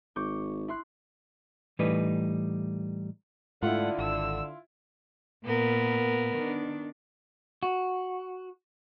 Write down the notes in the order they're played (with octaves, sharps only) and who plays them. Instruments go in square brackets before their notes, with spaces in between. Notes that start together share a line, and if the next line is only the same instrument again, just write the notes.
[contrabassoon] G#1 [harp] C#6 D6 G6
[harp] E4 C6 F#6
[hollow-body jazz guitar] A2 E3 G3 A3 D#4 B4
[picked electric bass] G#2 A3 [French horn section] D3 [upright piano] E4 F4 [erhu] F#5
[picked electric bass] G#1 [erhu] E6
[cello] A#2 [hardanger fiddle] B3 A#4
[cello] D#3 D4
[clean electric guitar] F#4